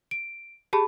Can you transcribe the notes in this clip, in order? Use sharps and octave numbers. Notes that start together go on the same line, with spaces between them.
D7
G4 G#4 A5 B5